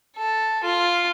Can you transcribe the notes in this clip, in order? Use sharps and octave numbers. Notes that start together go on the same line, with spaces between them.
A4
F4